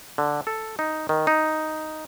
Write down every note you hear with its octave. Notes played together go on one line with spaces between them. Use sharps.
D3
A4
D#4
D#3
D#4